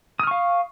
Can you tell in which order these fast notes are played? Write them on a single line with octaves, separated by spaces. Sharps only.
D#6 F6 C#6 F5